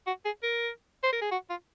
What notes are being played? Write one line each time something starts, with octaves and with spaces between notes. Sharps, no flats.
F#4
G#4
A#4
C5
A#4
G#4
F#4
F4